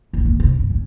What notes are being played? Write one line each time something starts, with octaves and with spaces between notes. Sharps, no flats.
A#1
D#3
C3
G2
C#3